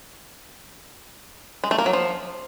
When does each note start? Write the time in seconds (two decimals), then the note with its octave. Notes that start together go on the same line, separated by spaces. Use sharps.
1.64 G#3
1.71 A3
1.78 A#3
1.86 F#3
1.93 F3